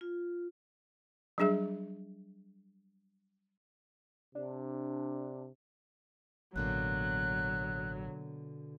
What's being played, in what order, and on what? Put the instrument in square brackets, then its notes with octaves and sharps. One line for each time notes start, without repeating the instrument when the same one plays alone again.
[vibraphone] F4
[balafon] F#3 G3 D4 G#4 E5
[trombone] C3 [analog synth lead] D4
[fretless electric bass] A1 [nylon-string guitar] B2 D3 A#3 [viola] F#3 [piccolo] F#6